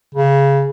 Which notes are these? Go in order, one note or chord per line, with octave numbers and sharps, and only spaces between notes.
C#3